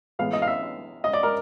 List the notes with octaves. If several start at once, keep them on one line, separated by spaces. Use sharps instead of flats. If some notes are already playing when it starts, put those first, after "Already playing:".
A2 E3 G#3 B3 F5
D#5
F5
E5
D#5
D5
A#4